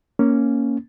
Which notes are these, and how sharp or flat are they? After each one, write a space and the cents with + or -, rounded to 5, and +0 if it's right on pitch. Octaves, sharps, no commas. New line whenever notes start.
A#3 +0 C#4 +0